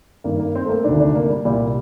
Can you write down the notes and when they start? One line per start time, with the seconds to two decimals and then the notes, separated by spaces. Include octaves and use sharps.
0.24 G2 D#3 A#3
0.39 A#3
0.55 C4
0.65 A3
0.69 A#3
0.84 D2 C3 D#3 D4
1.00 D4
1.15 A#3
1.30 G3
1.45 C2 A#2 G3